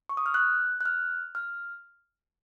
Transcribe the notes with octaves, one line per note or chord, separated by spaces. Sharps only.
C#6
D#6
F6
F#6
F#6
F6
F6